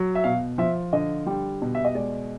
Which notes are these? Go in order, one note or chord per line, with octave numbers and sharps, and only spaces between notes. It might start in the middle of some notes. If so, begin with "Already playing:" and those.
Already playing: F#3
E5
B2 F5
F3 E5
D3 D#5
G3
B2
E5
D#5
G#3 D5